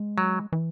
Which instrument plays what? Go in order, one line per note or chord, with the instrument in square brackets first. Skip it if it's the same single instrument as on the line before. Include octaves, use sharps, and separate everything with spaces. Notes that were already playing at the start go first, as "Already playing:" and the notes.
Already playing: [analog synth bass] G#3
[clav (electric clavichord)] F#3
[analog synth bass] E3